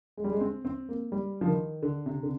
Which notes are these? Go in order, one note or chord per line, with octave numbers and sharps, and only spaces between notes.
G#3
G3
G#3
C4
C4
A#3
G3
F3
D#3
D3
C3
D3